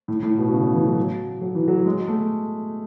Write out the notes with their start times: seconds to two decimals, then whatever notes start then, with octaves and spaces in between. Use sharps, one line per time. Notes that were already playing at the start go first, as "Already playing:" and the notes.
0.08 A2
0.23 A2
0.38 B2
0.48 B2
0.53 C#3
0.64 C#3
0.74 E3
0.86 F#3
1.41 F#3
1.55 E3
1.68 F#3
1.86 G#3
2.08 A3